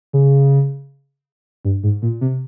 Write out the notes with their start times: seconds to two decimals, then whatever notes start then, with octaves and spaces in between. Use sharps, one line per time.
0.13 C#3
1.65 G2
1.83 G#2
2.02 A#2
2.21 C3